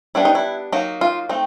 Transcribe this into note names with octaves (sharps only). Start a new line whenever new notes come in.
G3 B3 D4 E4
D#4
E4
F#3 A#3 D#4
F4
A3 C4 D#4